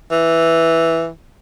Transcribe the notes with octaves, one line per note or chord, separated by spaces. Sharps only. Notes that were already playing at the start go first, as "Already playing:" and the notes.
E3